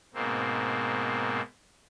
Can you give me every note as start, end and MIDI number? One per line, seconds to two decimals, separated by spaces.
0.14 1.41 44
0.14 1.41 47
0.14 1.41 58
0.14 1.41 60